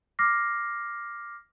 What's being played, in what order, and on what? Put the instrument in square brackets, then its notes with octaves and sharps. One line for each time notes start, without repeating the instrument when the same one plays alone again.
[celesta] D6 F6 A#6 C7